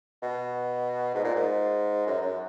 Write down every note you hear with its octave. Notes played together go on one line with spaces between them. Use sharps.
B2
G#2
A#2
G#2
F#2
F#2